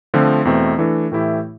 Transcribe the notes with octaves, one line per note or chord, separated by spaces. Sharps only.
D3 F3 A3 C4 F4
E2 B2 A3 C4
E3 A3 D4 A4
A2 E3 A3 E4 G4